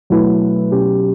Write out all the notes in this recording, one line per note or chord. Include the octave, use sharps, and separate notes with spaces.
B2 F#3 A3 E4 B4
B2 F#3 C#4 G4